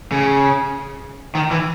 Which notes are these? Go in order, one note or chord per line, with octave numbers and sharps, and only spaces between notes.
C#3
D#3
E3